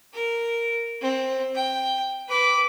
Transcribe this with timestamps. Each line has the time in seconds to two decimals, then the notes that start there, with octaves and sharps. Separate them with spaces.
0.14 A#4
1.01 C4
1.55 G5
2.29 B4 D6